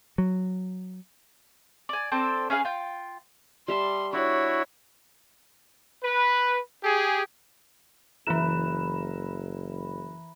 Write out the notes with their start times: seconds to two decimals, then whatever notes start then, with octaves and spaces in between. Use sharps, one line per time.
0.18 F#3
1.89 D5 G#5
2.12 C4 D4 A4 C5
2.50 C#4 G#4 B4 F5
2.65 F4 G5
3.68 G3 E5 A5 C6
4.13 D4 E4 F#4 C#5
6.03 B4
6.84 G4 G#4
8.27 F#1 E3 E4 A#4 B4 E7